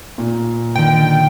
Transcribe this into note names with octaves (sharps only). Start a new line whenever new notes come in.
A#2
D3 D#3 D4 G5